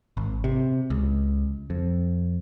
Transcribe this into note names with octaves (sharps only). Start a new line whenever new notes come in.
G#1
C3
C#2
F2